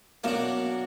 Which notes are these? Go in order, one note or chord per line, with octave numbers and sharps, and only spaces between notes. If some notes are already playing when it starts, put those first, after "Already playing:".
F#2 B2 A#3 D4 F#4 F5 E7